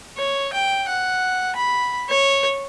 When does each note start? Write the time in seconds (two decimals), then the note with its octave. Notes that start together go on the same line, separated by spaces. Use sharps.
0.17 C#5
0.53 G5
0.88 F#5
1.56 B5
2.09 C#5